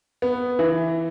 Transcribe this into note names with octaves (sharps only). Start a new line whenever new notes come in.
B3
E3